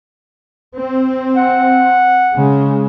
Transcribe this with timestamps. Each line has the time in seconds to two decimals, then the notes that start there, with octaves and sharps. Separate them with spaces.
0.75 C4
1.36 F#5
2.35 C#3 G#3